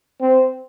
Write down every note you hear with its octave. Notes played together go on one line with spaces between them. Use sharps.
C4